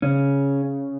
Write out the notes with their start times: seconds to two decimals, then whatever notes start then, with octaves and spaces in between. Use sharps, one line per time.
0.02 C#3 C#4